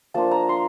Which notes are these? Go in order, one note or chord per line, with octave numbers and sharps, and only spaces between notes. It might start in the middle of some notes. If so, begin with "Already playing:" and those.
F3 A#3 D4 F4 A5
A#5
C6